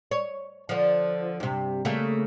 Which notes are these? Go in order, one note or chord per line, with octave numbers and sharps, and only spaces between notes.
C#5
D3 F3
G2 C3
C#3 A3 A#3